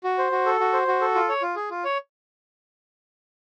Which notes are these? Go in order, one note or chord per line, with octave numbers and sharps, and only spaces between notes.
F#4
C5
F#4
A4
F#4
C5
F#4
A4
F4
C#5
F4
G#4
F4
C#5